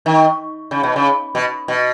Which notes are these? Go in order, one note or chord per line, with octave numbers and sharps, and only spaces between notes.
D#3
C#3
B2
C#3
B2
B2